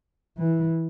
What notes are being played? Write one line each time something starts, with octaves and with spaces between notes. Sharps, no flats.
E3